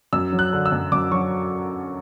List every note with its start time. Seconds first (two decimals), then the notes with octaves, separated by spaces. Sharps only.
0.13 F#2 E6
0.33 F#3
0.39 F#6
0.53 D3
0.66 E6
0.72 F#2
0.92 F#2 D6
1.12 F#3 C#6